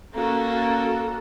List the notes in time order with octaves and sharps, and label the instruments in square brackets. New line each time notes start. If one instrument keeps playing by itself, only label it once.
[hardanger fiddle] A#3 [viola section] C#4 F#4 A4